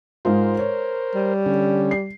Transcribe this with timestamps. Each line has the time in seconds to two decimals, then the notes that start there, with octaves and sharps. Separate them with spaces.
0.25 G#2 G#3 F4 A#4 C5
0.59 C#5
1.15 G3
1.46 D3 C#4
1.91 C7